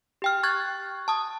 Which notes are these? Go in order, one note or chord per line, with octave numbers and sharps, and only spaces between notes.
G4 G5 F6
C#6 F#6 G#6 A6
A5 D#6